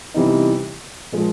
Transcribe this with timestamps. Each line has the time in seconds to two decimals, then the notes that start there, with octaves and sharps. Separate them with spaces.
0.14 C3 E3 G3 B3 D#4
1.12 A#2 F3 G#3